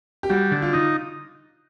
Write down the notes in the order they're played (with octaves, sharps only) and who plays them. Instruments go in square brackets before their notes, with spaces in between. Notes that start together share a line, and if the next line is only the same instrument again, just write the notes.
[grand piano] G4
[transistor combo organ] G3 [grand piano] F#4
[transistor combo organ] D3
[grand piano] F4
[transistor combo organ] D#4